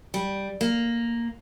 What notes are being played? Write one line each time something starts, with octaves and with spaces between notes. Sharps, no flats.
G3
A#3